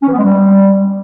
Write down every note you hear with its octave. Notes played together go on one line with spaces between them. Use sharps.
C#4
E3
B3
G#3
G3